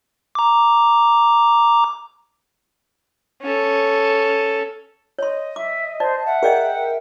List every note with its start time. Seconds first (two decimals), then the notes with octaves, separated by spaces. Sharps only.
0.35 A#5 D6
3.42 C#4 A4
5.19 C#5 D#5 C6
5.56 E5 D6
6.00 C5 D5 A5
6.25 E5 F#5
6.43 G#4 A#4 D5 D#5 G5